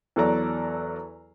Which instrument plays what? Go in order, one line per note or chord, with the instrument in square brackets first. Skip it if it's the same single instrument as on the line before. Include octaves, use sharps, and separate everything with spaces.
[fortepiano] E2 F#3 A4 D5 A#5